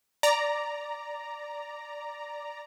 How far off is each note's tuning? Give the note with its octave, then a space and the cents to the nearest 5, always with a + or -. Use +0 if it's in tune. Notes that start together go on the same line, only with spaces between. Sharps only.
D5 +0 A#5 +0